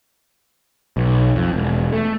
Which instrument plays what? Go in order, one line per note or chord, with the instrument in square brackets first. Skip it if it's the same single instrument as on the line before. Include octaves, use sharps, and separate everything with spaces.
[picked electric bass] B1
F2
E1
A3